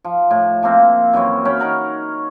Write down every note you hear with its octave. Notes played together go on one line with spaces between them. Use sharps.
F3
A2
F3 A#3 C4
F#2 E3 C4 C#5
C#4 C#5 G5 B5
D#4 A#4 F#5